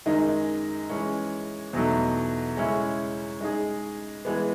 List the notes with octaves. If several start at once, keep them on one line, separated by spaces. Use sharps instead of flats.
F#2 D#3 G#3 D#4
E3 G#3 C#4
E2 B2 F#3 A3 D#4
C#3 G#3 C#4 E4
G#3 D#4 G#4
E3 G#3 B3